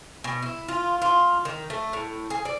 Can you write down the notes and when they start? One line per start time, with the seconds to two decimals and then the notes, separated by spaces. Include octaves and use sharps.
0.24 B2
0.42 E4
0.68 F4
1.02 F4
1.45 D#3
1.70 A3
1.93 A2
2.30 G#4
2.45 D5